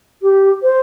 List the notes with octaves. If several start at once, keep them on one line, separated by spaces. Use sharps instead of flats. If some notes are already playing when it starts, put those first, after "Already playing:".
G4
C5